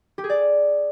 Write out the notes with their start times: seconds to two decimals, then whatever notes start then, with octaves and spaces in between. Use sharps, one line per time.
0.18 G4
0.24 G#4
0.30 D5